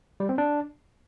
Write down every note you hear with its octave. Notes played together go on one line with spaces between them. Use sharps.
G3
C4
D4